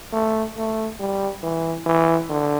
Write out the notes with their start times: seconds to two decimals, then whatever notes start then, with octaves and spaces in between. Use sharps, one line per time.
0.13 A3
0.57 A3
1.00 G3
1.43 E3
1.86 E3
2.30 D3